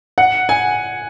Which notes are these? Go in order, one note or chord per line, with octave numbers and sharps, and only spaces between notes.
F#5
G#5